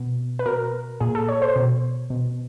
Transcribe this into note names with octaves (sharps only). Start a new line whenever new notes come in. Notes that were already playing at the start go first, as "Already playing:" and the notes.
Already playing: B2
B4
B2 A#4
A#2 G#4
A4
C#5
C5
B2
B2